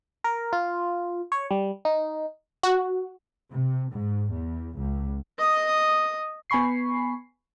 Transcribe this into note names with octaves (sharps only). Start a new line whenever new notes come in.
A#4
F4
C#5
G3
D#4
F#4
C3
G#2
E2
C#2
D#5 D#6
B3 G#5 B5 C#6 C7